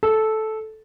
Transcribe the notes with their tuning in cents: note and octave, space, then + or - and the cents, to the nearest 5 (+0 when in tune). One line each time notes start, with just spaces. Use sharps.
A4 -10